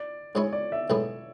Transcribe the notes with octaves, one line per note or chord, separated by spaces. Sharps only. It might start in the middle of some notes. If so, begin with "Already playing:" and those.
Already playing: D5
G#2 G#3 C#4 E4 C#5
D5
E5
B1 A2 G#3 B3